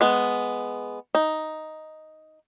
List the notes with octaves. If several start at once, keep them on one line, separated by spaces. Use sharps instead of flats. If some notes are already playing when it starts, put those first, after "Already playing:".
G#3 B3
D#4